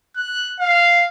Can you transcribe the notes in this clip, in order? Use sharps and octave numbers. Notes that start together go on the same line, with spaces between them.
F#6
F5